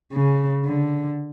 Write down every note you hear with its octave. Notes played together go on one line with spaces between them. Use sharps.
C#3
D3